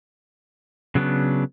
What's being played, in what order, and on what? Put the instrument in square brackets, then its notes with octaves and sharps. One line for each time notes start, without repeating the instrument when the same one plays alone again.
[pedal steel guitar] C#3 F#3 B3 D4